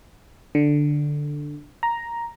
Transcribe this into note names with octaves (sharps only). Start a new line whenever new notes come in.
D3
A#5